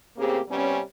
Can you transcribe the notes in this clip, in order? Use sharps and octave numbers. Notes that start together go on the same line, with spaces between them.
A2 C#3 A#3 C4 G4 G#4
C3 G3 B3 C#4